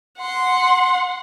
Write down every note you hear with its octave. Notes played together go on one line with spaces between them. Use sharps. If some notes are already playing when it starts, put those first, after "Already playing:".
F#5 C6